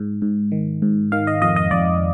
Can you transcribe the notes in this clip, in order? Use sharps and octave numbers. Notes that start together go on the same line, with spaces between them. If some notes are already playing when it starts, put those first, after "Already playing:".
Already playing: G#2
G#2
D#3
G#2
D#3 F5
D#5
F2 D#5
D#5
F2 D5